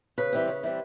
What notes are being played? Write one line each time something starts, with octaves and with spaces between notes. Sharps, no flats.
C#3 B4
E3 G3 C4
C#3
E3 G3 C4